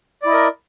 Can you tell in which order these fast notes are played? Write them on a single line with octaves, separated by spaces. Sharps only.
D5 E4 D#5 A#4